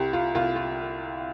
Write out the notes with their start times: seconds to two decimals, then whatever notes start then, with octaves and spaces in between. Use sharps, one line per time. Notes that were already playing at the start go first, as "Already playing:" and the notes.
Already playing: C2 G4
0.13 F4
0.35 C2 F4
0.56 F4